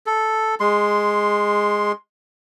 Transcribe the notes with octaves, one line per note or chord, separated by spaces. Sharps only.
A4
G#3 C6